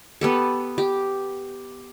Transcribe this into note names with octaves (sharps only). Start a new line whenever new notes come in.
B3 G4 A4
G4